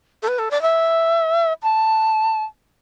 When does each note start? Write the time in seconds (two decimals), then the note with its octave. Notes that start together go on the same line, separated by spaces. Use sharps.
0.23 A4
0.28 B4
0.39 A4
0.51 D5
0.62 E5
1.63 A5